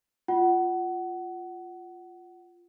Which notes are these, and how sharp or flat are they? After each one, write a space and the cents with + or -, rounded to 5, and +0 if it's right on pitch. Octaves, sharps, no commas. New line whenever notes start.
F4 +0 F#5 +20